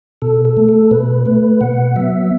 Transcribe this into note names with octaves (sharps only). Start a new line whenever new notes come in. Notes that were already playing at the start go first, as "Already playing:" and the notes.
B2 A4
A4
A3
A4
B2 B4
A3 B4
B2 F#5
F#3 B3 E5